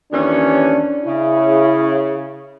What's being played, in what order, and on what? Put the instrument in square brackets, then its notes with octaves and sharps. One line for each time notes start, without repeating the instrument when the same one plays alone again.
[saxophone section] D#2 E3 C#4 [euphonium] D4
[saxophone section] C#3 [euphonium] E4